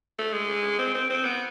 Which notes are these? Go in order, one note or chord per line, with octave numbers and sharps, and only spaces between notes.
A3
G#3
C4
C4
C4
B3